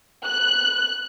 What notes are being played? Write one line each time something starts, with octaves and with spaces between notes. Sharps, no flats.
F#6